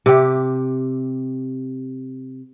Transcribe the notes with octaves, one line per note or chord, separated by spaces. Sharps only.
C3 G4